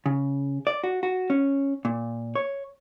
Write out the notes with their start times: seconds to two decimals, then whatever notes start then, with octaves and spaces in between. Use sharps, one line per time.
0.06 C#3
0.67 D5
0.84 F#4
1.03 F#4
1.30 C#4
1.85 A#2
2.35 C#5